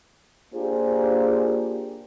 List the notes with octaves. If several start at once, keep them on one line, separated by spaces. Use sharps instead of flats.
A#3 D4 F4 G4 G#4 C5